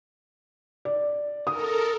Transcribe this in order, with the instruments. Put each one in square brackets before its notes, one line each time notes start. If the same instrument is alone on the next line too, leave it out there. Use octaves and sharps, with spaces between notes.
[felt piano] D5
[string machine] A4 A#4 [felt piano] D#6